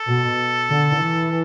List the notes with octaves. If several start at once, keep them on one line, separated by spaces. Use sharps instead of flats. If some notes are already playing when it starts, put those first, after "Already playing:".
Already playing: A4
B2
D3
E3